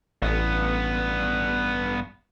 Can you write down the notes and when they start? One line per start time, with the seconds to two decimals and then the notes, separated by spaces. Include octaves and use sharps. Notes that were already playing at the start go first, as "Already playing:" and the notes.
0.22 A1 G2 B3